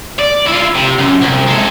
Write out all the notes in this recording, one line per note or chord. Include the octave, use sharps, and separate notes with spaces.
D5
E4 F4
C3
F#2
C2
G#3 A4